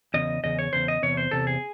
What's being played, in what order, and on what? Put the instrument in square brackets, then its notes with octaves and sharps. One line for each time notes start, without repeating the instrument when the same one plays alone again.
[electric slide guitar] E2 C#3 D#5
E2 C#3 D#5
C#5
E2 C#3 C5
D#5
E2 C3 C#5
C5
E2 C3 A4
G#4